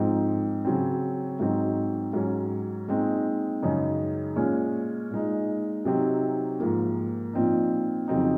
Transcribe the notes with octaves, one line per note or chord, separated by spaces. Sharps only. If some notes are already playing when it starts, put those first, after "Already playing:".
Already playing: G#2 F3 C4 D#4
C#3 F#3 C4
G#2 F#3 C4 D#4
G#2 F#3 C#4
A#2 G#3 C4 D#4
F#2 C#3 G#3 D#4
A#2 G#3 C#4
A#2 G#3 D#4
C3 F#3 C4 D#4
G#2 F3 A#3
A#2 F3 C4 D#4
F2 C#3 F#3 C4 D#4